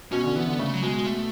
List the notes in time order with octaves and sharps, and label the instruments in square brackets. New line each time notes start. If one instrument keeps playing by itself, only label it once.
[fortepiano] B2 [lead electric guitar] C#4
[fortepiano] D3
[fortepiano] E3 [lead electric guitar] B3
[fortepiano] D3
[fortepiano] C#3 [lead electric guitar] A3
[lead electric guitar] F#3
[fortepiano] B2 [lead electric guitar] G#3
[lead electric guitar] A3